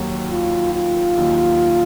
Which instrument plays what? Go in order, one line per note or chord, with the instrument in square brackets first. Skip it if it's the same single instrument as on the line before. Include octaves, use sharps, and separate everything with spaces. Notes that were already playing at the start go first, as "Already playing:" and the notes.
Already playing: [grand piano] D#2 D#3 F#3
[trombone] F4
F4
[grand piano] D#2 D#3 F#3